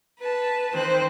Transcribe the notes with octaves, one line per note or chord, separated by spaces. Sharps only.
B4 A5
D#3 C4 C5 F#6